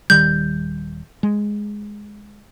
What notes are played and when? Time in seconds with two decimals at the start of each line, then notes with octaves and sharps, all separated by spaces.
0.10 D#1 D#3 G3 G6
1.23 G#3